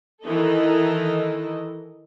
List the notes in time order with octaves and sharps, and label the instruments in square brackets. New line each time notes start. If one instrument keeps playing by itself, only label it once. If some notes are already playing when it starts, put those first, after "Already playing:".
[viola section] D#3 E3 A4 D#5